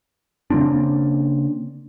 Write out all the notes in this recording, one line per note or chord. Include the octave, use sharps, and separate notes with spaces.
C#3 A#3 C4 D4